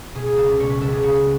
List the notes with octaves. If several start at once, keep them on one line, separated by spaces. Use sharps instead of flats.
B2 G#4
G#4
C#2 A4
D5
B2 C#5
B4
C#2 A4
G#4
C#3 F#4